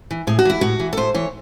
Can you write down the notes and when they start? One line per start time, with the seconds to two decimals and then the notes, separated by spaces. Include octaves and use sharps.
0.11 E3
0.27 A2 G#4
0.39 F#4
0.45 E3 E4
0.61 A2 F#4
0.80 E3
0.93 A4
0.97 A2 C5
1.15 E3 C#5